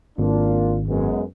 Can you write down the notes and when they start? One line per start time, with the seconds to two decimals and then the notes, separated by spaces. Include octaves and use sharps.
0.18 G#1 A#3 D4 F4
0.88 F#2 G#3 B3